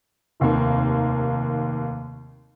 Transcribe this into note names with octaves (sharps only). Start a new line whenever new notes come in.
F1 D#2 C3 A#3